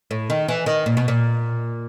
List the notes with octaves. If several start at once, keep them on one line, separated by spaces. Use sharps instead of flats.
A2
D#3
E3
D#3
A#2
B2
A#2